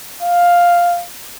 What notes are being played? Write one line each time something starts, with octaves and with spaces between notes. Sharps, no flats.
F5